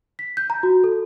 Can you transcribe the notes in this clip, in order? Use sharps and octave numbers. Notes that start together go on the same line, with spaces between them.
B6
G6
A#5
F#4
A4